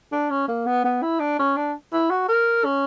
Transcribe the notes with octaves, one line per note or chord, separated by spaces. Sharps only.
D4
C#4
A#3
B3
B3
E4
D4
C#4
D4
E4
F#4
A#4
C#4